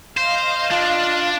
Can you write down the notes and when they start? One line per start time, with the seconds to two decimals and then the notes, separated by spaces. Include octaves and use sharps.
0.17 C5 D#5 F5
0.71 D4 F4